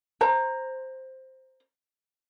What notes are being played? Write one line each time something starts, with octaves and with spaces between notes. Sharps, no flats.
C5 A#5